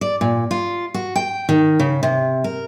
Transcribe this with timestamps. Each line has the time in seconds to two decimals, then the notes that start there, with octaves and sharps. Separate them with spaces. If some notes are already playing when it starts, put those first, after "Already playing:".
0.01 D5
0.21 A#2
0.51 F4
0.94 F#4
1.16 G5
1.49 D#3
1.80 C#3
2.03 C3
2.44 A#4